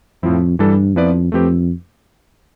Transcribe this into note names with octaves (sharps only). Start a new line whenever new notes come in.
F2 A2 F3 C4 E4
G2 E3 G3 D4 A4
F2 F3 B3 E4 B4 D5
F2 A3 C4 G4 B4